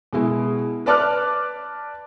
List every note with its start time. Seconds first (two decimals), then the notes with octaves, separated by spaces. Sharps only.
0.13 B2 G#3 E4
0.86 B4 D5 A5 D6 F6 F#6